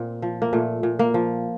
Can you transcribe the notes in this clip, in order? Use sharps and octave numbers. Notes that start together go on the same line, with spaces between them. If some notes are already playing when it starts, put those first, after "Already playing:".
Already playing: A#2 A#3 C4
F3
A#3
A#2 A3
A#2
A#3
F3